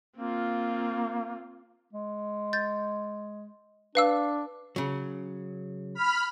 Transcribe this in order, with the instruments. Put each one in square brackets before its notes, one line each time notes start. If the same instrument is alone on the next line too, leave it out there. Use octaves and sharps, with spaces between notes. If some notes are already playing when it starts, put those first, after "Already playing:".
[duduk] A#3 [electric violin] C4 F4
[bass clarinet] G#3
[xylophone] G6 A6
[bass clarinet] D4 [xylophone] B4 F5 E6
[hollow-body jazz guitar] C#3 F#3
[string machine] B5 F6